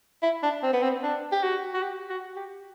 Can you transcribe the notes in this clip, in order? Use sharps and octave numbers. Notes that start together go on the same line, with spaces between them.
E4
D4
C4
B3
C4
D4
G4
F#4
F#4
G4
F#4
G4